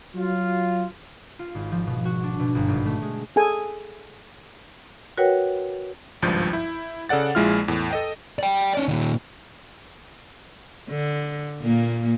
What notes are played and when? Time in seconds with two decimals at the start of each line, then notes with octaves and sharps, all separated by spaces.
0.14 F#3 F4
1.39 F4
1.55 G#1
1.72 F3
1.87 B2
2.05 F#4
2.23 D4
2.40 B2
2.55 G1
2.68 G#1
2.86 A3
3.02 G#3
3.36 G#4 A4 G#5
5.18 F#4 A#4 B4 C#5 F#5 G5
6.22 G#1 C#2 G2 F3 G6
6.53 E4
7.09 C#3 A4 D5 F#5 A6
7.35 A#1 G#3 E4 F4 F6
7.68 E2 A2
7.91 A4 D#5 G5
8.39 D5 G5
8.75 C#4 D5
8.88 A#2 D#3
10.89 D3
11.61 A#2 A#3